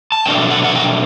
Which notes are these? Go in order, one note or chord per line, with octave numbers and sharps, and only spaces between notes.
A5
B2 F#3 A3 D4 G5
F#5
F#5
G5